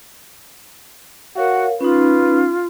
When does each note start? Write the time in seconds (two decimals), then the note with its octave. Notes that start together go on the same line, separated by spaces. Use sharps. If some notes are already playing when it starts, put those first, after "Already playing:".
1.36 F#4 A#4 C#5 F5 F#5
1.81 C#4 D#4 F4 B4